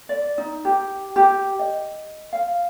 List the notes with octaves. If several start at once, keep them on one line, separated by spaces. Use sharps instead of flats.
D5
D#4
G4
G4
D#5
F5